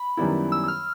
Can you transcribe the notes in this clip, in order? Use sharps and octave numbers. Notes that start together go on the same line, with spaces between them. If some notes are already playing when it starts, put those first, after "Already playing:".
Already playing: B5
F#2 D#3 G3 B3 E4
E6
E6
F6